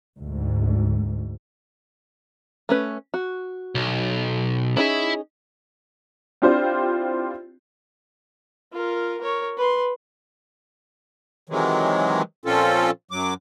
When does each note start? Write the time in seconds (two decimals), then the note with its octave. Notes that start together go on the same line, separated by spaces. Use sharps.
0.19 D2 G#2
2.69 A3 C#4 B4
3.14 F#4
3.75 B1
4.77 C#4 D#4 E4 G#4 E5
6.42 C4 D4 E4 F4 G4 C5
8.72 F4 A#4
9.21 A#4 C#5
9.57 B4 C6
11.49 C3 D#3 E3 F#3 G#3
12.45 A#2 F3 C4 C#4 F4 A4
13.11 F#2 F#3 D6